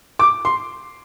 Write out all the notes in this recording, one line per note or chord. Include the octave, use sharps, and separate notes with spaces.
D6
C6